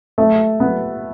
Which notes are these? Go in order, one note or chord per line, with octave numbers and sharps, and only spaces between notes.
A3
B3